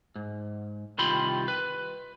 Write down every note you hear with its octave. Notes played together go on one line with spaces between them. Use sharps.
G#2
C2 D#3 F4 G4 B5 C6
B4